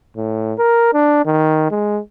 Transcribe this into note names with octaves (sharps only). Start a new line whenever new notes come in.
A2
A#4
D4
D#3
G#3